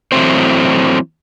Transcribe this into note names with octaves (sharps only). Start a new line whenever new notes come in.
E3 F#3 A3 C4 C5